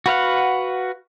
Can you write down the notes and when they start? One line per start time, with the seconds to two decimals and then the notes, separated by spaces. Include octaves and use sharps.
0.06 F#4 B4 F5 F#5